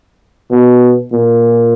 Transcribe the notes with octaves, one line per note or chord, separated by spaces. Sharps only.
B2
A#2